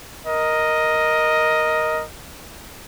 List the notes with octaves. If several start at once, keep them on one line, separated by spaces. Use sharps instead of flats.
A#4 D#5